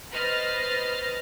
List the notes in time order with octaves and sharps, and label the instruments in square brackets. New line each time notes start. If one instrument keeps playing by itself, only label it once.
[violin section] B4 C5 D#5 F6 A6